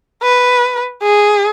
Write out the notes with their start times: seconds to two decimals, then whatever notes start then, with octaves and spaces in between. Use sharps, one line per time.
0.22 B4
1.03 G#4